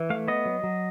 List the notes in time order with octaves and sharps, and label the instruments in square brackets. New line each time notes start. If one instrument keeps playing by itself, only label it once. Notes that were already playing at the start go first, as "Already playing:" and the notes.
Already playing: [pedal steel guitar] E3
A3 F5
B3 D#5
F#3
F#3